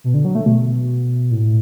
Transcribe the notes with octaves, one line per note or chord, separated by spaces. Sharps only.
B2
D3
F#3
A3
B2
A2